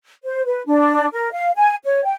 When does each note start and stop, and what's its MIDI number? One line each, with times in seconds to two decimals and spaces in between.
0.23 0.42 72
0.45 0.61 71
0.66 1.07 62
1.12 1.30 70
1.32 1.51 77
1.56 1.75 80
1.84 2.03 73
2.05 2.16 79